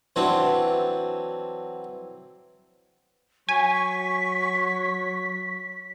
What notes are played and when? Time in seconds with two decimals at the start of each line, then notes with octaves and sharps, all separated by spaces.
0.16 E3 F#3 C4 D4
3.49 F#3 G#5 C#6 B6